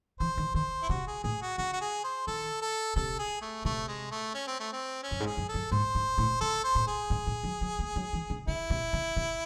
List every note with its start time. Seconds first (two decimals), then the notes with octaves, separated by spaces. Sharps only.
0.20 E3 C5
0.38 D#3
0.54 D#3 C5
0.82 E4
0.89 C3 F#4
1.07 G#4
1.23 A2 G#4
1.42 F#4
1.58 C#3 F#4
1.73 F#4
1.81 G#4
2.04 C5
2.27 D#3 A4
2.62 A4
2.96 C3 A4
3.19 G#4
3.42 A3
3.65 C3 A3
3.88 G#3
4.11 A3
4.34 C#4
4.47 C4
4.60 A3
4.73 C4
5.03 C#4
5.11 F#2
5.20 G#2
5.26 G#4
5.37 F#2
5.49 A4
5.54 F#2
5.72 G#2 C5
5.95 G#2
6.18 A2
6.41 C#3 A4
6.64 C5
6.75 A2
6.87 G#4
7.10 G#2
7.27 A2
7.44 F#3
7.61 F#3
7.79 A3
7.96 F#3
8.13 E3
8.30 C#3
8.47 C#3 E4
8.70 C3
8.93 C#3
9.17 C3